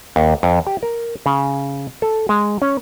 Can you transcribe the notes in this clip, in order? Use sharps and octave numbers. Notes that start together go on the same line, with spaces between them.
D#2
F2
G4
A#4
C#3
A4
G#3
C#4